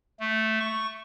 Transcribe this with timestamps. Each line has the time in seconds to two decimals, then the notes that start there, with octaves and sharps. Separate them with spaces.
0.20 A3
0.60 C#6